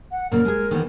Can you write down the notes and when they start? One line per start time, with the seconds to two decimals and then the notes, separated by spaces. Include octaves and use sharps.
0.11 F#5
0.31 A#2 C#3 A#3 A#4
0.45 G#3 G#4
0.71 D#3 E3 B3